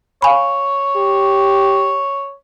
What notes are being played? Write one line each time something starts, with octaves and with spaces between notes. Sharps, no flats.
C#5 F5 G#5 B5
G4